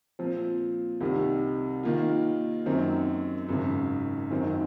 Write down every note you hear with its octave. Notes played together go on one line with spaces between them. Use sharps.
A#2 F3 C4
C2 C3 D#3
D#3 A#3 F4
F#2 D#3 F#3 C4
G#1 F#2 C#3
F#1 F#2 D#3 F#3 C4